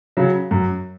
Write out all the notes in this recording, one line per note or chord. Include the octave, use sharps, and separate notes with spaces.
C#3 F#3
F#2